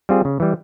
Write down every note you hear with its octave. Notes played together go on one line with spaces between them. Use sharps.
G3 C4 F4 G#4
C#3
E3 G3